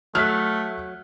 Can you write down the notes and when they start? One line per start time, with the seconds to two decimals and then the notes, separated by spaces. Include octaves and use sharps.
0.15 F#3 A3 F6 F#6 B6